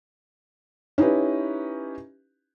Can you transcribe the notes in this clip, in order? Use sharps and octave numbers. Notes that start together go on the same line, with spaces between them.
C#4 D#4 E4 G4 B4